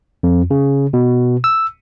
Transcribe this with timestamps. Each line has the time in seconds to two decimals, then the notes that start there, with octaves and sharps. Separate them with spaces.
0.23 F2
0.51 C#3
0.93 B2
1.44 E6